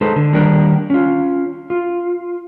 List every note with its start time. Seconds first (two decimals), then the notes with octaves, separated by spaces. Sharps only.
0.01 G#3 D#4 A4 B4 C5
0.16 D3
0.33 D#3 G3 A#3 D4 G4 A#4
0.90 C#4 F4
1.70 F4